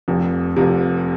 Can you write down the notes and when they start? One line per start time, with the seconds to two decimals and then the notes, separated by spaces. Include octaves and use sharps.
0.08 F1 F2 C3
0.56 F1 F2 C3